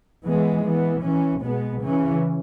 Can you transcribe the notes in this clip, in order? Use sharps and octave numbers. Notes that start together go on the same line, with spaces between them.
E3 G#3 B3
E3 B3
E3 C#4
B2 G#3 B3
C#3 E3 C#4